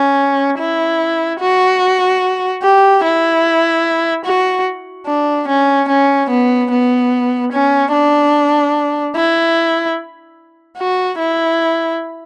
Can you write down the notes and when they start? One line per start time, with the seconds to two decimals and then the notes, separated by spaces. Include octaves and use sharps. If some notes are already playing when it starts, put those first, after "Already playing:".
Already playing: C#4
0.59 E4
1.40 F#4
2.62 G4
3.03 E4
4.25 F#4
5.07 D4
5.48 C#4
5.89 C#4
6.29 B3
6.71 B3
7.52 C#4
7.93 D4
9.15 E4
10.78 F#4
11.19 E4